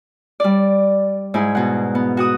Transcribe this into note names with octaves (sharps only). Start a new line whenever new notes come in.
G3 D5
G#2 E4 G#4
B2 F#5
B3
F#4 F#5 D#6